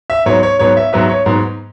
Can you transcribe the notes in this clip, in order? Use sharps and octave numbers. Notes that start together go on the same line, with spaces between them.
E5
G#2 F#3 B3 C#5
C#5
G#2 F#3 B3 C#5
E5
G#2 F#3 B3 E5
C#5
G#2 F#3 B3